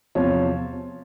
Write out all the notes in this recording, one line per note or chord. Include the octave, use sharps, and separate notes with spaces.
E2 C3 F3 C#5